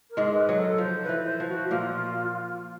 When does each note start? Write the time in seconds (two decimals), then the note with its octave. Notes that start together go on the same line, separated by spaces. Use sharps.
0.10 A#4
0.17 G#2 G#3
0.33 B4
0.49 F#3
0.56 A4
0.78 F3 C5
1.02 B4
1.09 E3
1.25 C5
1.40 F3
1.48 F#4
1.71 A#2 A#3 F4